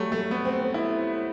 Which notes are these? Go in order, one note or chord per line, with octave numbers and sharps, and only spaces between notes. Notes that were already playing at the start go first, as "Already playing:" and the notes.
Already playing: F#3 G3 A3
A3
B3
C4
C4
E4